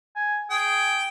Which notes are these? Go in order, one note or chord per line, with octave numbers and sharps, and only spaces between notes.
G#5
G#4 G5